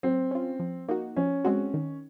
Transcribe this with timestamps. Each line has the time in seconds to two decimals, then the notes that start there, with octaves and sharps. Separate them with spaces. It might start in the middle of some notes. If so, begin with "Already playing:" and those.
0.03 F#3 C4
0.31 C#4 F4
0.60 F3
0.88 A#3 D#4 F#4
1.16 F3 C#4
1.45 G#3 C4 F#4
1.74 D#3